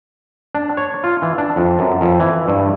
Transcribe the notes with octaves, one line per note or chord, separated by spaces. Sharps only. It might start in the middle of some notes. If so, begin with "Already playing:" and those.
D4
C#5
F4
E3
D4
F2
F#2
F2
E3
G2